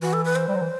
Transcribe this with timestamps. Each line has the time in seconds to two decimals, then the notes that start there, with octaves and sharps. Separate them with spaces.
0.02 E3 F#4
0.13 A4
0.25 B4
0.35 C5
0.48 G3
0.55 F#3
0.61 E3